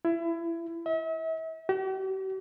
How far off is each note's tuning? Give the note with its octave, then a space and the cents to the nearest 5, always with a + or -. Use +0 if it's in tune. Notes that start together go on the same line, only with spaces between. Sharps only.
E4 +25
E5 -40
G4 -45